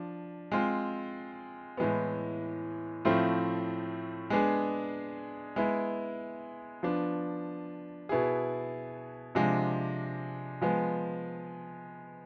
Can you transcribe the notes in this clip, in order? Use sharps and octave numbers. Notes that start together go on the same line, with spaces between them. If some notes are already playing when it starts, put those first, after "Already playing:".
Already playing: F3 D4
G#3 C4 F4
A2 E3 G#3 B3
A2 F3 A3 C4 F4
G#3 B3 D4 G#4
G#3 B3 E4
F3 B3 D4
B2 B3 E4 G#4
C3 F3 G#3 D4
F3 G#3 B3